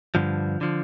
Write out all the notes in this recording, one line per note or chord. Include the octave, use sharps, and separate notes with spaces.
G2 D3 F3
D3 F3